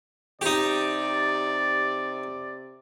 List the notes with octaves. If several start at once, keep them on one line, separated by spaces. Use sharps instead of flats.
C3 D#4 G4 D5